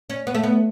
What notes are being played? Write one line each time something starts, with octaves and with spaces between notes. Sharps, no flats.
C#4
B3
A3
B3